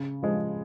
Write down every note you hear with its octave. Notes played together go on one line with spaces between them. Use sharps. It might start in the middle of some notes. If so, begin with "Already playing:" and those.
Already playing: C#3
F3 G#3